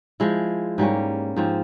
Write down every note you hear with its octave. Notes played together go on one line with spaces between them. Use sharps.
F3 G#3 E4
G#2 G3 A#3 C#4
G#2 F3 C4